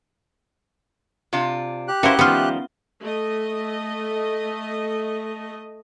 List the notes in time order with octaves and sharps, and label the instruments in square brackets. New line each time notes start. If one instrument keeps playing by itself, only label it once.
[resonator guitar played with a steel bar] C3 D4 F4
[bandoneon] G4 F#6
[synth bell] C#4 E5 G7 [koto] E4 F#4 [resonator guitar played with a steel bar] A#4 C5 F5
[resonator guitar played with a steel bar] D#3 F3 G3 [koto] B3 F4
[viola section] A3 D#5